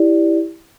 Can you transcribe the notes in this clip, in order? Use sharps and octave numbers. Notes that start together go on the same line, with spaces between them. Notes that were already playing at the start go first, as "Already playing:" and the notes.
Already playing: E4 G4 D5